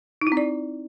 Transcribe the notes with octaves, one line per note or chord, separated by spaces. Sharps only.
D#4
E4
C4
D5